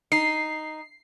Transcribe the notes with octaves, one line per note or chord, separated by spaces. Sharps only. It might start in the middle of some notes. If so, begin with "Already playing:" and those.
D#4 C7